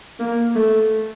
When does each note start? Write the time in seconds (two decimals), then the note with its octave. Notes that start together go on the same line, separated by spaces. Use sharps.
0.19 A#3
0.55 A3